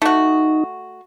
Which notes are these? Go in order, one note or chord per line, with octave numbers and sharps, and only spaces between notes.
A3 D#4 F#4